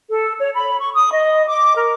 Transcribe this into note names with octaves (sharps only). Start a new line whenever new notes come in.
A4
C#5
B5
C#6
D#6
D#5
D6
A#4